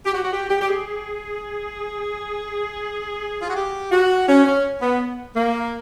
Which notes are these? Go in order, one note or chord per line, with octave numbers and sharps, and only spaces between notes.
G4
F#4
F#4
G4
G4
G4
G#4
F4
F#4
G4
F#4
C#4
C#4
B3
A#3